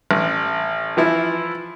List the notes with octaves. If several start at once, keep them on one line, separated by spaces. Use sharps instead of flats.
A1
E3 F3 E4